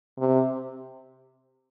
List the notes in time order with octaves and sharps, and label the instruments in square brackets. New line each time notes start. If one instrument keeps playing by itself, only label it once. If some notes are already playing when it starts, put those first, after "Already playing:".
[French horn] C3